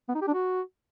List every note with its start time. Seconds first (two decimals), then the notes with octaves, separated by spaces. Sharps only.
0.09 B3
0.15 D#4
0.21 G4
0.27 D4
0.34 F#4